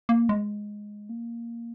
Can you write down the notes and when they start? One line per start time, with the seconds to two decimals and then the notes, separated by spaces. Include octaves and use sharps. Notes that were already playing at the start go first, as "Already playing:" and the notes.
0.09 A#3
0.29 G#3
1.09 A#3